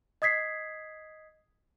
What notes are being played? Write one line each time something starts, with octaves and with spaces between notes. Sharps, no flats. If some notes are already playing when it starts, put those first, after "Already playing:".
D#5 D#6 G#6 B6 C7